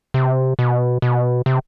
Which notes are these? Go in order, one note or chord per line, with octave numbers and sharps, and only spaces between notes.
C3
B2
B2
C3